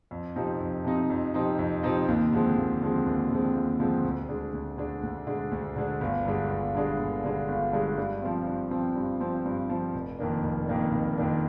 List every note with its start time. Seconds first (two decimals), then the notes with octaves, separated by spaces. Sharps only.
0.11 F2
0.36 C3 F3 C4 D#4
0.60 F2
0.84 C3 F3 C4 D#4
1.10 F2
1.34 C3 F3 C4 D#4
1.59 F2
1.83 C3 F3 C4 D#4
2.08 D#2
2.32 D3 F3 G#3 C4
2.57 D#2
2.82 D3 F3 G#3 C4
3.06 D#2
3.30 D3 F3 G#3 C4
3.55 D#2
3.80 D3 F3 G#3 C4
4.04 D2
4.29 D3 G#3 D4
4.53 D2
4.78 D3 G#3 D4
5.03 D2
5.27 D3 G#3 D4
5.51 D2
5.76 D3 G#3 D4
6.01 G1
6.25 G2 D3 G#3 D4
6.50 G1
6.75 G2 D3 G#3 D4
6.99 G1
7.24 G2 D3 G#3 D4
7.48 G1
7.73 G2 D3 G#3 D4
7.98 G2
8.22 F3 C4
8.47 G2
8.71 F3 C4
8.96 G2
9.21 F3 C4
9.46 G2
9.70 F3 C4
9.94 F1
10.19 F2 D#3 A#3 D4
10.43 F1
10.68 F2 D#3 A#3 D4
10.93 F1
11.18 F2 D#3 A#3 D4